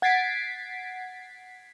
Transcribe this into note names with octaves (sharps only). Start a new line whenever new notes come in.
F#5 G#6 A6 B6 C7 D7